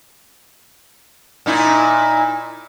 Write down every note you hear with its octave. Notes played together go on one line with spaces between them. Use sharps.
A#2 D#4 E4